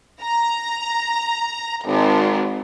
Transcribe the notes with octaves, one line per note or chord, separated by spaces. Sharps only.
A#5
G#1